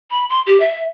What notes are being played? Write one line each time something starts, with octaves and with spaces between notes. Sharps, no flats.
B5
C6
G4
E5